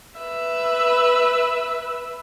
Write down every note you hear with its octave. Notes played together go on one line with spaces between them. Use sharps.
B4 E5